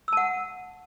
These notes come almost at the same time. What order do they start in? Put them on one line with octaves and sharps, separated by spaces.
E6 A5 F#5